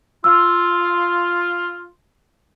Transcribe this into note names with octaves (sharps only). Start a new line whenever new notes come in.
F4 E6